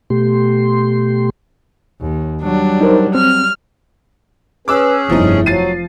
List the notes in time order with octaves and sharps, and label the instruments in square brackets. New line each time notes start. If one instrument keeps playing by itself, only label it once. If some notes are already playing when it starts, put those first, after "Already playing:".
[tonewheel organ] B2 A3 G4 C6
[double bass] D#2
[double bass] F#3 G3 [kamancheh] D4
[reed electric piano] D#4 A#4 C5
[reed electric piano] C4 [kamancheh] F6
[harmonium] C#4 G#4 [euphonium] B4 [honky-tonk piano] D6 E6 F#6
[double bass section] F1 G2 [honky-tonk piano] F3 B3 D#4 [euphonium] E4
[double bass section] F3 [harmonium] F#3 [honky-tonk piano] A6 C7 D#7